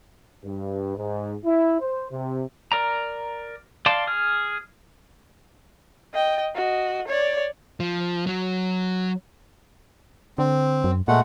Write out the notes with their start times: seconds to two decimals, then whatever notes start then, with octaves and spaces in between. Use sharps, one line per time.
0.45 G2
0.97 G#2
1.45 E4
1.81 C5
2.11 C3
2.72 A#4 D5 A#5
3.86 D5 F5 A5 C6 D6
4.07 G#4 F6
6.14 D#5 G5
6.55 F#4 D#5
7.08 C#5 D5
7.80 F3
8.27 F#3 F#4
10.38 D3 C4
10.84 F#2
11.08 A#2 G#3 A3 F#5